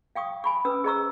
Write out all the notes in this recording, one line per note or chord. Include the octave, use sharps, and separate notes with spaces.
F5 G5 C#6 D#6
G#5 B5 C#6
C#4 B4 D#6 E6
G#4 C5 D#5 A#5 C#6 E6